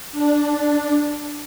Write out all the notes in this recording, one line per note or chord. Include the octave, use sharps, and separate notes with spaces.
D4